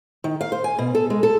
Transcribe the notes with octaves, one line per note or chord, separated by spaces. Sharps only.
D#3
F5
C5
G#5
B2
A4
G#3
A4